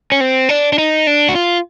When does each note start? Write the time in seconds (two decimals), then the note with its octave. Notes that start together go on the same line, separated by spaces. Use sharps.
0.12 C#4
0.21 C4
0.49 D4
0.73 D4
0.78 D#4
1.07 D4
1.29 F#4
1.35 F4